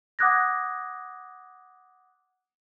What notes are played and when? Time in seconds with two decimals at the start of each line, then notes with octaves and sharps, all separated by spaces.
0.19 F#5 D6 D#6 F#6 G#6 A#6